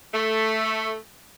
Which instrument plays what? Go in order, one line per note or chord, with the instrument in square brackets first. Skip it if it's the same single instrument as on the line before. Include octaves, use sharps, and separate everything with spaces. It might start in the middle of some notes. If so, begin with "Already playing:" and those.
[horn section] A3